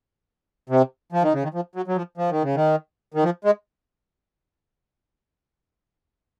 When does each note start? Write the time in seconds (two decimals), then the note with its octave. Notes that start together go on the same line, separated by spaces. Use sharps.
0.70 C3
1.12 F3
1.23 D#3
1.33 C#3
1.43 D#3
1.54 F3
1.75 F#3
1.88 F#3
1.96 F3
2.18 F3
2.30 D#3
2.43 C#3
2.55 D#3
3.14 D#3
3.24 F3
3.45 G#3